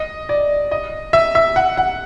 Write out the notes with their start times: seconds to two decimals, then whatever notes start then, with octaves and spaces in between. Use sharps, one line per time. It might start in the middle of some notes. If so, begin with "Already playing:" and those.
Already playing: D#5
0.29 D5
0.71 D#5
1.13 E5
1.35 E5
1.56 F#5
1.77 F#5